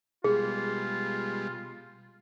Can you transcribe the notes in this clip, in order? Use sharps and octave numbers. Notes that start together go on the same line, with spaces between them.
B2 G3 G#3 F4 G#4